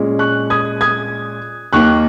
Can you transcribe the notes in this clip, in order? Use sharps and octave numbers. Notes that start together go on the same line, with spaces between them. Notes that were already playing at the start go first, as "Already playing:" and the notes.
Already playing: A#2 G#3 C#4
C#6 F#6
D#6 G#6
D#6 G#6
D#2 D#3 A#3 C#6 F#6